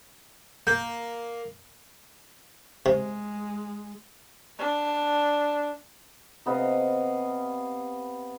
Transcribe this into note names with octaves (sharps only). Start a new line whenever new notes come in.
A#3 G6
C3 G#3
D4
C3 B3 D#5 F5